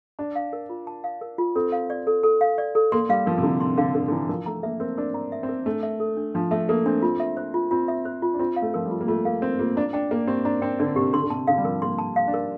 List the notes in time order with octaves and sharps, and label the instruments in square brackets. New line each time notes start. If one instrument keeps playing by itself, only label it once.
[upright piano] D4 [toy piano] A5
[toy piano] F5
A#4
F4
A5
F5
A#4
F4
[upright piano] C4 [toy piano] A4
[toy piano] F5
D5
A4
A4
F5
D5
A4
[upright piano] A#3 [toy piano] C6
[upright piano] G3 [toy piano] F5
[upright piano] F3 [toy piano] A#4
[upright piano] C3
[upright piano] D3 [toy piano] E4
[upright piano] C3 [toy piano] C6
[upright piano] D3 [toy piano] F5
[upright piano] D3 [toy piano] A#4
[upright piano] D3
[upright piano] E3 [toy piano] E4
[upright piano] F3 [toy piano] A#4
[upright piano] A3 [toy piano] A#5
[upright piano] A#3 [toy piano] E5
[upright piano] C4 [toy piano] A#4
[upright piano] D4 [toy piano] A#4
[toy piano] A#5
E5
[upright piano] C4
[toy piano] A#4
[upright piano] A3 [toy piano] D4
[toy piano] E5
A4
D4
[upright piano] F3 [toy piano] D4
[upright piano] A3 [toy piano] E5
[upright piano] A#3 [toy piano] A4
[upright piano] C4 [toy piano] D4
[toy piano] F4
E5
C5
F4
[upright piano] C4 [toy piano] F4
[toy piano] E5
C5
F4
[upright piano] D4
[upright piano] C4 [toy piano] F4
[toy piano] F5
[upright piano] A3
[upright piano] F3 [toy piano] A#4
[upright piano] G3
[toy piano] F4
[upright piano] A#3
[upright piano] A3 [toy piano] F4
[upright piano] A#3 [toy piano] F5
[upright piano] C4 [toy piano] A#4
[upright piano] A#3 [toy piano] F4
[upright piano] D4 [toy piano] A#5
[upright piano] D4 [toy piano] G5
[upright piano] A#3 [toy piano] D5
[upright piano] C4 [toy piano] G4
[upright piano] D4 [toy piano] A#5
[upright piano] C4 [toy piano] G5
[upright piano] D3 [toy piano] D5
[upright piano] C3 [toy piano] G4
[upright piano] D3 [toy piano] C6
[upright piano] D3
[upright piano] C3 [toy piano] A5
[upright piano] D3 [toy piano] F5
[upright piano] G3
[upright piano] F3 [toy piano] A#4
[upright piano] A#3 [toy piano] C6
[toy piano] A5
F5
[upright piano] D4
[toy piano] A#4